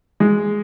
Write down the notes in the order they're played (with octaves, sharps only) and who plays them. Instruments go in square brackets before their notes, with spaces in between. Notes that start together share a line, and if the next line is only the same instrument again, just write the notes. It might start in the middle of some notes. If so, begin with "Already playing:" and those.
[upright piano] G#3